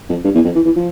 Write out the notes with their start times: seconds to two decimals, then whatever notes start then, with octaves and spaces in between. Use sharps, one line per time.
0.09 F2
0.24 G2
0.34 E2
0.44 F2
0.55 E3
0.65 E3
0.76 F3